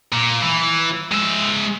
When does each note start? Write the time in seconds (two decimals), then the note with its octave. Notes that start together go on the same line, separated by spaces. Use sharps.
0.12 A#2
0.43 E3
1.12 G#3 E5